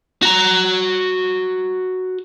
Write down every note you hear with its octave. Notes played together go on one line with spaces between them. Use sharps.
F#4 A#5